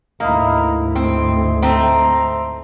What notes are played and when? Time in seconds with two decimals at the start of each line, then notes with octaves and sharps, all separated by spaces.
0.20 D2 G#2 A#3 D#4 E4
0.95 A3 C4
1.62 A3 C4 A#5